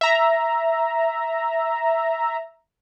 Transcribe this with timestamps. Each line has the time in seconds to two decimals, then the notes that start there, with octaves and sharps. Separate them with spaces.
0.01 E5 A#5